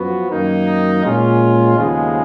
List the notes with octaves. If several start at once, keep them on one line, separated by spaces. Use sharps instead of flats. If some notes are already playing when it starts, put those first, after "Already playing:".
Already playing: F#2 F3 B3 F#4
F#2 D#3 A#3 D#4
A#2 G#3 C#4 F4
D#2 C#3 F3 G#3 B3